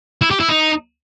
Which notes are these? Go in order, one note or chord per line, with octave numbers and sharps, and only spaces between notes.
E4
G4
E4
D#4